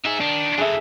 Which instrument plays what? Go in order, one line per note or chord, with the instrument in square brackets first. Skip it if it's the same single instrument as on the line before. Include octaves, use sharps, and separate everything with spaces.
[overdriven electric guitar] D#4 G#4 [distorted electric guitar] E5
[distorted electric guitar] D#3 [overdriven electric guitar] D4
[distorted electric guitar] F#2 E3 [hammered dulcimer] G#4 A4 E5